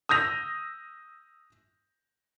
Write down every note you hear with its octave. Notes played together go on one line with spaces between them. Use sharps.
D#6 E6 G6 A#6 F7